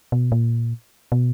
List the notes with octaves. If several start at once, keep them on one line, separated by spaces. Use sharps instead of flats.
B2
A#2
B2